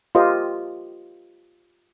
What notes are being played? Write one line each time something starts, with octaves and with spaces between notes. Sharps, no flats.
F4 G4 A#4 C5 D#5